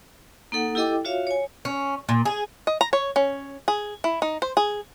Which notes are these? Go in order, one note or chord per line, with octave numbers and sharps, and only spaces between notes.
A#3 D#4 A4 F#5
E4 G4 A4 D#5 G5 D6
F4 F#4 C#5 E5 F5
C#5 G#5
C#4
A#2
G#4
D#5
A#5
C#5
C#4
G#4
E4
D#4
C5
G#4